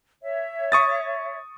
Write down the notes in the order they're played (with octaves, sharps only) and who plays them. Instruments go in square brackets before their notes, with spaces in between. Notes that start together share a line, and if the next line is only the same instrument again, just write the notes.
[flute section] C#5 E5
[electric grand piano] C#6 D#6 A6